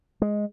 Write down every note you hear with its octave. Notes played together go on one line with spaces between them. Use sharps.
G#3